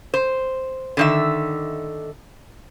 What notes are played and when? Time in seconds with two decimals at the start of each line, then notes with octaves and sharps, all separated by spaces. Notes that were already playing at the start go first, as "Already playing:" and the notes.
0.14 C5
0.97 D3 D#3 E5